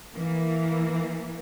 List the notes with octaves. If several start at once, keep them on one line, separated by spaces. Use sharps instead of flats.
E3 A#3